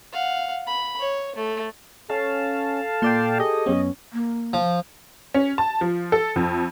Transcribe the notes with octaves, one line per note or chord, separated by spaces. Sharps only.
F5 F#5
B5
C#5
A3
C#4 A4 F5 A5
A#2 D5 G5 C6
G4 G#4 D#5
F#2 B3 C#4
A#3
F3
C#4
A5
F3
A4
F2